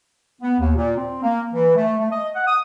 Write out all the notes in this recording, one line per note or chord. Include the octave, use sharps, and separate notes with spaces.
B3
D#2
A#2
C4
A#3
E3
A3
A3
D#5
F#5
D#6